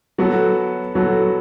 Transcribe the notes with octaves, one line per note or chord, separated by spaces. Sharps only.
F#3 B3 F#4 A4
F#3 B3 F#4 A4